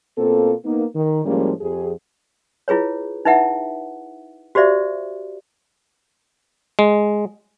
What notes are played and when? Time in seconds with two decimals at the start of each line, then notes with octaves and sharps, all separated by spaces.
0.17 B2 A#3 C4 F4 A4
0.64 A#3 B3 D#4
0.95 D#3
1.25 A2 F3 G3 G#3 A#3 C#4
1.61 F2 G4 G#4
2.68 E4 F4 G#4 B4 C#5
3.25 D#4 E4 B4 E5 F#5
4.55 F#4 G4 C5 D5 E5 F5
6.79 G#3